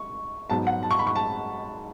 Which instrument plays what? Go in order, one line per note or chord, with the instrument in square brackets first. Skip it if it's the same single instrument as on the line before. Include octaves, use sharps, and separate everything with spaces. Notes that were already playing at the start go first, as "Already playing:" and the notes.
Already playing: [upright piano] C#6
G#2 F#3 B3 A5
F#5
A5
C#6
B5
C#6
A5